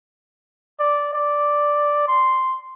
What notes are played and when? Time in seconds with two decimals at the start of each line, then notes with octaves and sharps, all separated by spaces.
0.79 D5
1.13 D5
2.08 C6